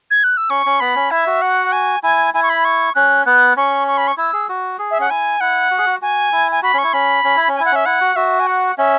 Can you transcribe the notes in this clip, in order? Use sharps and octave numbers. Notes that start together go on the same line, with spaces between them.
G#6
F#6
E6
C#4 C#6
C#4
B3 B5
C#4
E4 E5
F#4
F#5
G#5
E4 G#5
E4 G#5
C#6
B5
C#6
C#4 F#6
B3 F#6
C#4 C#6
C#6
B5
C#6
E4 E6
G#4
F#4
G#4
E5
C#4 F#5
E4 G#5
E4 F#5
F#4
G#4
F#4
F#4 G#5
E4
G#5
F#4 B5
C#4
E4 C#6
C#4 B5
C#4
E4
C#4
G#5
E4
F#5
C#4 E5
E4 F#5
F#4
F#4 E5
G#5
F#5
C#4 E5